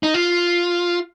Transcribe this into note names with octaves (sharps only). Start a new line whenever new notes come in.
D#4
F4